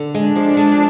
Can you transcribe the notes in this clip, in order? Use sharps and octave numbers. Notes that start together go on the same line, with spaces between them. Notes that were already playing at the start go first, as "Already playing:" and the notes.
Already playing: D3
G#3
D4
F3
G#3